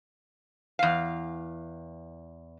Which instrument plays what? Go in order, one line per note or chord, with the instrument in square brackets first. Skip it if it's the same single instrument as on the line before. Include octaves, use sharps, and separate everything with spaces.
[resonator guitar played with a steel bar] E2 F5